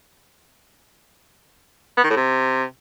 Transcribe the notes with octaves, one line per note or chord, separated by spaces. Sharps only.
B3
D#3
A2
C3